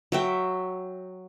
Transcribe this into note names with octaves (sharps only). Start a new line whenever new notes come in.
F#3 E5 G5